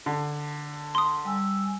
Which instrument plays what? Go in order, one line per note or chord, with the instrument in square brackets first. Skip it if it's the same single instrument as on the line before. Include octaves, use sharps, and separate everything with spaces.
[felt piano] D3
[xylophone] C6 D#6
[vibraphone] G3 G#5 E6